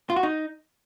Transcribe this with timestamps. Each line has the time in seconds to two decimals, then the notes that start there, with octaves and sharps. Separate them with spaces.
0.10 F4
0.16 F#4
0.23 D#4